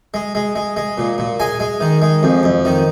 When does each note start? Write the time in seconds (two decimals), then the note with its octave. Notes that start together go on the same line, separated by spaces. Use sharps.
0.14 G#3
0.35 G#3
0.55 G#3
0.77 G#3
0.98 A#2
1.18 A#2
1.40 G#3 G#5
1.60 G#3
1.81 D#3
2.02 G#3
2.23 F2
2.43 F2
2.65 D#3